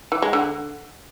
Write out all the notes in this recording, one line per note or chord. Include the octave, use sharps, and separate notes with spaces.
E3
G#3
D3